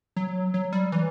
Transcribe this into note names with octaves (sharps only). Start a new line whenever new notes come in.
F#3
F#3
G3
E3